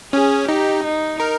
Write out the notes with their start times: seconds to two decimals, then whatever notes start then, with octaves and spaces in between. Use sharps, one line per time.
0.13 C#4 G#4
0.48 D#4 G4
0.84 D#4
1.20 A#4